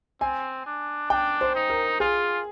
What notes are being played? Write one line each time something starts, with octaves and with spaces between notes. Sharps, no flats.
C4 G#5
D4
D4 G5
C5
D#4
A#4
F4 G#4